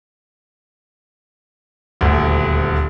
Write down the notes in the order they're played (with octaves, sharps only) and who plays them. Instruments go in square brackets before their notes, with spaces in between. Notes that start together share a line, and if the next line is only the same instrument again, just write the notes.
[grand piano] D#1 D2